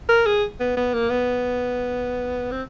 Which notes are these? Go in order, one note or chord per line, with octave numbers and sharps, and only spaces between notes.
A#4
G#4
B3
B3
A#3
B3
C4